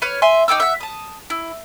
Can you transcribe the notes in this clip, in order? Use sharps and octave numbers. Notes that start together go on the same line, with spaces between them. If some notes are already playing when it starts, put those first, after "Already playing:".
B4 C#5 F6
E5 G#5 C6
D#4 G5 D6 E6
E5 F#5
A5 D#6
E4